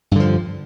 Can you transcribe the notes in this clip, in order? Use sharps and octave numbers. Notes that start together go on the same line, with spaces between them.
G2 D3 F3